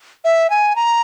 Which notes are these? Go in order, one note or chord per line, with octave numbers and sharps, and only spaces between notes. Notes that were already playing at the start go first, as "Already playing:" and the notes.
E5
G#5
A#5